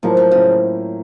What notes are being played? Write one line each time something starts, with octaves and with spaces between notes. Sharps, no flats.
A2 F3 F#3 A#3 F4
F3
A2 C#3 F#3 A#3 F4